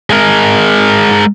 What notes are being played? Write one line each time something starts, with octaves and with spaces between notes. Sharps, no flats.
G#3 A#4